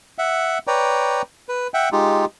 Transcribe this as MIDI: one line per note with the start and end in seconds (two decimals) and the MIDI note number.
0.18 0.58 76
0.18 0.58 78
0.67 1.22 71
0.67 1.22 73
0.67 1.22 74
0.67 1.22 79
0.67 1.22 82
1.49 1.68 71
1.74 1.89 76
1.74 1.89 78
1.74 1.89 79
1.92 2.25 56
1.92 2.25 63
1.92 2.25 65
1.92 2.25 67